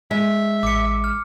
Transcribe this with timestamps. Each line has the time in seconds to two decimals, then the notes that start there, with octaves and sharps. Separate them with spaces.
0.11 G#3 E5
0.63 A1 D6 C#7
1.04 F6